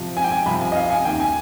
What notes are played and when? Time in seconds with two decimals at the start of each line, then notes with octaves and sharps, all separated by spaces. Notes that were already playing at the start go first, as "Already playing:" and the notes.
Already playing: F2 C3 F3
0.17 G#5
0.24 G5
0.32 G#5
0.46 C2 C3 F3 B5
0.61 G#5
0.72 D#5
0.75 F5
0.90 G#5
1.05 D#2 D#3 G5
1.20 G#5